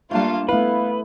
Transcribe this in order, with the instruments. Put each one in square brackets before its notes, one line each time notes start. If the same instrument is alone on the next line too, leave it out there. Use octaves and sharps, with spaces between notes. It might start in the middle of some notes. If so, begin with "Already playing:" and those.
[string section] G3 A#3 F4 [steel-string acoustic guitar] A3 D4 A5
[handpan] A3 E4 [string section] B3 [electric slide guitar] B4 [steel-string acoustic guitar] F5